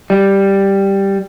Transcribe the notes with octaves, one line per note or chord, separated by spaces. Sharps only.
G3